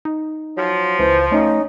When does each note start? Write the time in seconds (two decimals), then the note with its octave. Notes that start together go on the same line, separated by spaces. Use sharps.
0.05 D#4
0.57 F3 F#3
0.99 C#2 E3 C5
1.32 A3 C#4 D#4